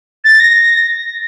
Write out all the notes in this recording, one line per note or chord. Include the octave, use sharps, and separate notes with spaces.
A6
A#6